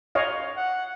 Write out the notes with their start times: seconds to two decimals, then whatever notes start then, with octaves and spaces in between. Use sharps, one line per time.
0.15 C#5 D#5 F5
0.57 F#5